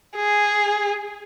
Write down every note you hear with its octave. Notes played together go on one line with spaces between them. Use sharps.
G#4